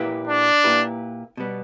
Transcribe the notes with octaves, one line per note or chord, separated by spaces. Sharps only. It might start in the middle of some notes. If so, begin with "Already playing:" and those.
Already playing: A#2 A#3 E4 G4 B4
D4
A#2 A#3 E4 G4 B4
B2 G3 B3